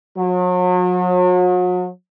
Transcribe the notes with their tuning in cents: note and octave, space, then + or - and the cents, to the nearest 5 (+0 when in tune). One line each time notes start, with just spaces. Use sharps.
F#3 -40